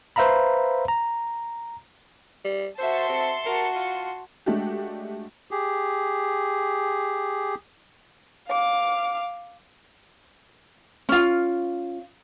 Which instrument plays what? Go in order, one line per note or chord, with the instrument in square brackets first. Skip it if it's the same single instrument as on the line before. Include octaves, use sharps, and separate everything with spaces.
[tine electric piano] B4 C5 E5 F5 A#5 B5
A#5
[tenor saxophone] G3
[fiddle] F#4 E5 [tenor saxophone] C5 [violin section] A5 C6 C#7
[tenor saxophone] C4
[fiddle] F#4 [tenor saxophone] A#4
[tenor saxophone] F4
[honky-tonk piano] G#3 A3 D4 F#4 G4
[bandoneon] G4 G#4
[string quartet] F5 D6
[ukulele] C#4 F4